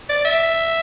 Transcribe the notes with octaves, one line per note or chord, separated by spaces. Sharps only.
D5
E5